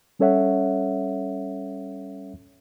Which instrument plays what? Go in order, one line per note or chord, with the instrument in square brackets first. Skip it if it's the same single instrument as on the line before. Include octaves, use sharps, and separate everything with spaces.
[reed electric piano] G3 C#4 A4 C#5 E5 F#5